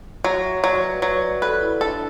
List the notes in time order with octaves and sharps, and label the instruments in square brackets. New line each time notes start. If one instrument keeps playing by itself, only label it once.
[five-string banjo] F#3 [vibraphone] F#5
[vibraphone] E5
[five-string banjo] F#3 [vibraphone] D5
[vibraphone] B4
[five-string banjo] F#3 [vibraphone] B4
[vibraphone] D5
[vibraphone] A4 [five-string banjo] B4
[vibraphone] E4
[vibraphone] D4 [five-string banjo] A4
[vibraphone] E4